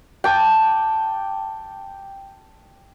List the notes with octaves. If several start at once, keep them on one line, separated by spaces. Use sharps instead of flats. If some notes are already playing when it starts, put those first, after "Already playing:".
G5 A5 D6